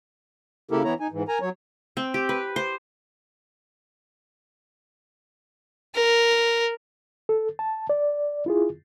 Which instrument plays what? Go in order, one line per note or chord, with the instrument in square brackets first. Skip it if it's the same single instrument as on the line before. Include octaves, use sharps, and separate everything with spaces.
[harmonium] C#3 A#3 E4 G4 A4 A#4
E3 B3 E4 C#5 A#5
D#4 G#5
G#2 E3
A#4 G#5 A#5
F#3 C#5
[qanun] C4
G4
B4
C5
[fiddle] A#4
[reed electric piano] A4
A5
D5
E4 F4 G#4